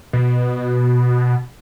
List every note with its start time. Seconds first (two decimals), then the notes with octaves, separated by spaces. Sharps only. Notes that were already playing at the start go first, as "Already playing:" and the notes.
0.13 B2